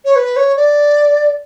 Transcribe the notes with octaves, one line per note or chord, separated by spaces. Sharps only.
C#5
B4
C#5
D5